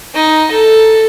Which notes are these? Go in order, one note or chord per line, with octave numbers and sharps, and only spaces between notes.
D#4
A4